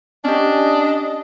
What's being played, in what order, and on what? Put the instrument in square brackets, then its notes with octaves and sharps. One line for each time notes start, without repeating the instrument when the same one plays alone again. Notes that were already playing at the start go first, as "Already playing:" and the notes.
[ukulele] C#4 G4 [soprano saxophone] D4 [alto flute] D#5